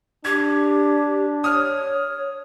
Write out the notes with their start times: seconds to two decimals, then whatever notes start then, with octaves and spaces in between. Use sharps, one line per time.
0.25 D4 G4 G#6
1.44 C#5 D#6 F6